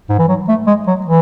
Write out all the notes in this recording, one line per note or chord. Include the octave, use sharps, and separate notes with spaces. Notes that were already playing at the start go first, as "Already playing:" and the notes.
G#2
E3
F#3
A3
G#3
F#3
E3